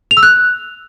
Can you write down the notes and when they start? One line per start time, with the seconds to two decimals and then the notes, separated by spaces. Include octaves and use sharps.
0.11 F7
0.17 E6
0.23 F#6